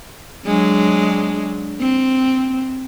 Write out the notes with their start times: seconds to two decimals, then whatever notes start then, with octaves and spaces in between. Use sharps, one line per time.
0.45 F#3 G#3 D4
1.79 C4